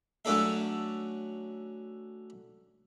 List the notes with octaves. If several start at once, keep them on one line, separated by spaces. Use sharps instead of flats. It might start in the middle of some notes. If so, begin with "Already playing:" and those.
F#3 A3 C#4 D4 A4 E5